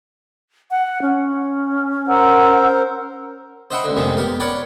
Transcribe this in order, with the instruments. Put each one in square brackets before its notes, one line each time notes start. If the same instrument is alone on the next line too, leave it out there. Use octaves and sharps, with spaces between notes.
[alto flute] F#5
C#4
[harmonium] A#4 C5 [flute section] F#5 A#5 E6
[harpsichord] C5 D#5 E5 F#5 G5 B5
C#2 D3
F2 A2 C3 D#3 G#3
B3 G4 A#4
A#4 C#5 D5 F#5 G5 B5